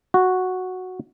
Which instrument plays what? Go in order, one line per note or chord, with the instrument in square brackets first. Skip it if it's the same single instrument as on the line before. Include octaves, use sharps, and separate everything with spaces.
[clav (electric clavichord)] F#4